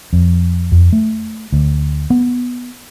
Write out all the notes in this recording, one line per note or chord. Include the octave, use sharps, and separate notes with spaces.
F2
F2
A3
D2
B3